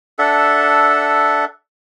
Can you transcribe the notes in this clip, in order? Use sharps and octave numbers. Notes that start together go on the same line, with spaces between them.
D4 A4 E5 F#5